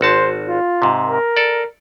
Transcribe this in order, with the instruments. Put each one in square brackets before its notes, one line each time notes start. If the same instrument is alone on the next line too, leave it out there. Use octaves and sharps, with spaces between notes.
[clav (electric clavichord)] G#1 F#4 A5 [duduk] C5
[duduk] F4
[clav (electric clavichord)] G#2 C3
[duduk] A#4
[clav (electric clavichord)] A4 D5